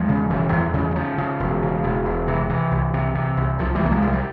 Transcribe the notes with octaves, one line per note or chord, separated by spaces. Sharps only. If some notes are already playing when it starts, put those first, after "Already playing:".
Already playing: E2 F3 G#3
C#3
E1 E3 G3
E2
C#3
G3
C#3 F3
C#3
E1
C#3
E1
E1
C3 E3
C3 E3
C2
C3
C3
C2
C2 F3
E3 G3
C2 A#3
F3 G#3
C2
G3